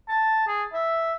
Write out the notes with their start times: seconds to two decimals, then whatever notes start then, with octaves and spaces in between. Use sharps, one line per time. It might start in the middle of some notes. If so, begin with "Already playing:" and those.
0.09 A5
0.47 G#4
0.73 E5